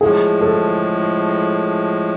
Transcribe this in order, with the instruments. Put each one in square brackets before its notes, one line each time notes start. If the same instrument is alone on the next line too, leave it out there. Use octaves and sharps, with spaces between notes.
[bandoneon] A2 F3 G#3 [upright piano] G#4
[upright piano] A4